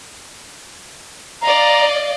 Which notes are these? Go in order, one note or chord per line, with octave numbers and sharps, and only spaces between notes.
D5 D#5 F5 A#5